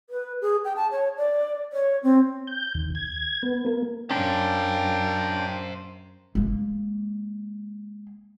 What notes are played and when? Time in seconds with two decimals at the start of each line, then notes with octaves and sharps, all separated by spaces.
0.10 B4
0.42 G#4
0.65 G5
0.76 A5
0.92 C#5
1.17 D5
1.73 C#5
2.03 C4
2.47 G6
2.75 D#2
2.95 G#6
3.43 B3
3.66 A#3
4.10 F#2 C#4 D4 C5 F5 G5 A#5
6.35 G#3 A#3